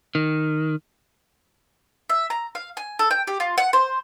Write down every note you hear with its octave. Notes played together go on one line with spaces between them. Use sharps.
D#3
E5
A#5
F5
G#5
A4
G5
G4
F4
F#5
C5